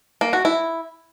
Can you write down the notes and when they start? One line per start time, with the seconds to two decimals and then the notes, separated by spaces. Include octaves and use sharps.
0.21 A#3
0.33 F#4
0.45 E4